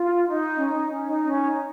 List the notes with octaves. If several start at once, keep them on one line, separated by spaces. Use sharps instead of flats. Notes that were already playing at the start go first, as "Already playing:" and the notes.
Already playing: F4
D#4
C#4
D#4
C#4
D#4
C#4
D#4